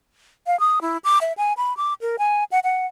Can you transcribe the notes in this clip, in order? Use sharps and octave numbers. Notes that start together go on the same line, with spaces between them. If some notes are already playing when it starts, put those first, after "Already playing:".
F5
D#6
E4
D6
E5
G#5
B5
D6
A#4
G#5
F#5
F#5